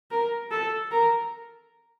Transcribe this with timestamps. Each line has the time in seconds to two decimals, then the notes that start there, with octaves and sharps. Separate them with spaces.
0.11 A#4
0.51 A4
0.91 A#4